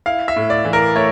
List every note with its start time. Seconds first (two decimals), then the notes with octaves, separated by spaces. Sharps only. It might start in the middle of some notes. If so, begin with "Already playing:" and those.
0.06 E4 F5
0.28 E5
0.36 A2
0.50 D5
0.65 E3
0.73 A#4
0.96 A3 C#5